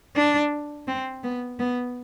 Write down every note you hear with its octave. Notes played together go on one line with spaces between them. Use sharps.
D4
C4
B3
B3